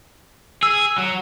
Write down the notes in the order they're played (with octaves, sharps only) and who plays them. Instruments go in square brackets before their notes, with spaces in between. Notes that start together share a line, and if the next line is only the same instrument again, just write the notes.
[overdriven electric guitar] G#4 [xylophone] E6
[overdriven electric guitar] F#3